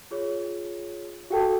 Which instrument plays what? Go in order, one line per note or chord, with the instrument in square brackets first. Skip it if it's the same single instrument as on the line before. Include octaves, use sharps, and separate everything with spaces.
[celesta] F4 G#4 C#5
[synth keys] F#4 A4 [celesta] F5 G5 A5